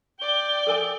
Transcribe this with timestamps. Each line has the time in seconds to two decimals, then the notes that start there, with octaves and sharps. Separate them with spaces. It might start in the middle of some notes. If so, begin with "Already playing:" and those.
0.19 D5 G5 G7
0.67 A4 A#4 G#5